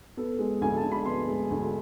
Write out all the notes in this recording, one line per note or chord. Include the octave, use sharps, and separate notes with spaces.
B3 A4
G#3
D2 G#5
A5
D3
B5
B3 C6
G#3
D2